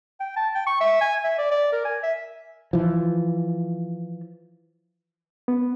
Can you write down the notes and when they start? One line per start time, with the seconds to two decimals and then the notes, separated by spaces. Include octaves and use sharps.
0.20 G5
0.37 A5
0.55 G5
0.67 C#6
0.81 E5
1.01 G#5
1.24 E5
1.38 D5
1.51 D5
1.72 A#4
1.85 G#5
2.03 E5
2.73 E3 F3
5.48 B3